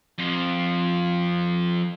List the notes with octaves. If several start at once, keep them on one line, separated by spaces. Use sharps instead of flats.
F2 F3